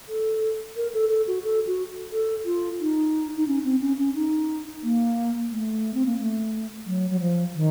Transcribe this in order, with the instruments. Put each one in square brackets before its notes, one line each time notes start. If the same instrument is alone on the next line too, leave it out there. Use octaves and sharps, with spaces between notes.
[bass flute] A4
A#4
A4
A4
F#4
A4
F#4
A4
F4
D#4
D#4
C#4
C4
C#4
C#4
D#4
A#3
A3
C4
A#3
A3
F#3
F#3
F3
D#3